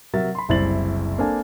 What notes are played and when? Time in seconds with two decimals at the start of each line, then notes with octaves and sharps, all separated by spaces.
0.14 C3 F#3 A#4 E5 A6
0.35 B5 C6
0.49 F#1 C2 E4 C5 A6 F#7
1.18 A#3 C4 D4 A4 G#5 A5